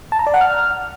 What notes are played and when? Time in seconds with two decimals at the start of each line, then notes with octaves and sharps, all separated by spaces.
0.12 A5
0.19 A#5
0.27 D5
0.34 F#5
0.41 F6